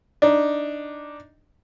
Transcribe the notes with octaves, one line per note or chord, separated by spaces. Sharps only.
D4 D#4